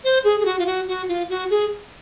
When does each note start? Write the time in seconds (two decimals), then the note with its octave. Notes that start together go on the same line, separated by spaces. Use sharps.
0.04 C5
0.24 G#4
0.40 G#4
0.45 F#4
0.59 F4
0.66 F#4
0.88 F#4
1.09 F4
1.30 F#4
1.50 G#4